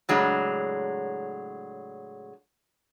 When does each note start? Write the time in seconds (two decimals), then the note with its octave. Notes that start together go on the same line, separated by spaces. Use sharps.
0.09 A2 C#3 F#3 G#3 D4